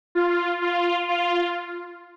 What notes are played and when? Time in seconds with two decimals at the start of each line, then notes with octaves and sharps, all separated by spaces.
0.15 F4
0.62 F4
1.09 F4